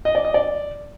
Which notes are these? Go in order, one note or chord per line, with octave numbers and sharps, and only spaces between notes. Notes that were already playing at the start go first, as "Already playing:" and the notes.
D#5
D5
D#5
D5